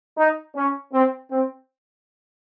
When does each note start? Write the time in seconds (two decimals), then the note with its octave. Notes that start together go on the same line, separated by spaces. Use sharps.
0.18 D#4
0.55 C#4
0.93 C4
1.30 C4